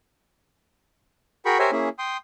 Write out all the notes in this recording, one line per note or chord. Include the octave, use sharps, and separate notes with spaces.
F#4 G#4 A#4 G5 B5 C#6
G4 A#4 C5 C#5 E5 G#5
A#3 C#4 E4 G#4
G5 C6 D#6